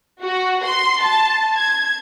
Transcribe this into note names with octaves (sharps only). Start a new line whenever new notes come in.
F#4
C6
A5
G#6